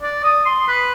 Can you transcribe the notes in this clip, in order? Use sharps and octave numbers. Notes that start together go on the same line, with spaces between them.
D5
D#6
C6
B4